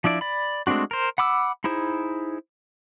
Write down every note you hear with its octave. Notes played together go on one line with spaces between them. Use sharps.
F3 D4 E4 D5
D5 B5
G#3 A3 C4 D4 F#4
A#4 C5
F#5 B5 D6 E6
D#4 E4 G#4 C5